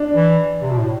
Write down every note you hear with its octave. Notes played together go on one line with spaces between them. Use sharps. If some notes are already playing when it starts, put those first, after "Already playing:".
Already playing: D4
E3
C3
B2
A2